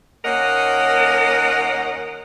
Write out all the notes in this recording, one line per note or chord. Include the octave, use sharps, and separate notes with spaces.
D#2 A#3 C#4 A#4 D#5 F#5